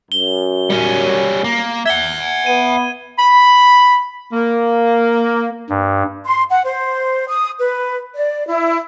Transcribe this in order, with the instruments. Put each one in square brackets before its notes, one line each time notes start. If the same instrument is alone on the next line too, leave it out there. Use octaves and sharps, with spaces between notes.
[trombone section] F#2 [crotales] G7
[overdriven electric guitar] G3 C#4
A#3
[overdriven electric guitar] E5 F#5 [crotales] G#6 G7
[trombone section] B3 [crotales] D#7
[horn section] B5
A#3
[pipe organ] G2
[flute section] C6
F#5
C5
D#6
B4
D5
E4